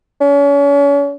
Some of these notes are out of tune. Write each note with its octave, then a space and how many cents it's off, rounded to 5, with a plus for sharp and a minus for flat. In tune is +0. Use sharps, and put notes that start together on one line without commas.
C#4 +40